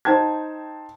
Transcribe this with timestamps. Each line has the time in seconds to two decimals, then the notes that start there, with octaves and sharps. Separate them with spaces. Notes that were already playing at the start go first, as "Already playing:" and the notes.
0.05 D#4 C5 G5 A5 G#6